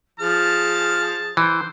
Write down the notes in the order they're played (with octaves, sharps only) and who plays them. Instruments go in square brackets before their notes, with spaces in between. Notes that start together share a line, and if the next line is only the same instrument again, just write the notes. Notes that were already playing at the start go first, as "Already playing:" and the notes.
[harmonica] F3 F6 [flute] G#4 [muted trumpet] A5
[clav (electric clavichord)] E3 [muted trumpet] C5